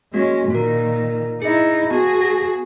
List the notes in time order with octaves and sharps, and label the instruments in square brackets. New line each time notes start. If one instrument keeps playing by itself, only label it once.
[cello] G#3 C#4 [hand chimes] A#3 F#4
[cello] A#2 D#3 [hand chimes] F4 A#4
[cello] D#4 E4 [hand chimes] G#4
[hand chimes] B3 A5 [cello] F#4 G#4